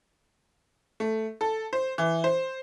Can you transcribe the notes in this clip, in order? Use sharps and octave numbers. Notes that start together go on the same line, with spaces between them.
A3
A4
C5
E3
C5